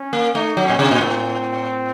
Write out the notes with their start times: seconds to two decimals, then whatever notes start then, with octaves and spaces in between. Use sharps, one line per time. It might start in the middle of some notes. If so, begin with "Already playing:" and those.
Already playing: C#4
0.13 A#3
0.35 A3 D#4
0.57 F#3
0.64 C#4
0.70 A#2
0.79 C3
0.91 A#2 C4
1.01 A2